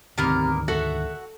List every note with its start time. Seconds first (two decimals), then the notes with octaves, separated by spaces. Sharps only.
0.18 D2 G#2 C3 D#3 A#3 B3 A#4
0.68 F#4 A4 E5 F#5